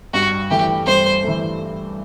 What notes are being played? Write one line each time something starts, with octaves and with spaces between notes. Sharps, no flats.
G2 F#4
E3 A3 G4
G2 C5
E3 A3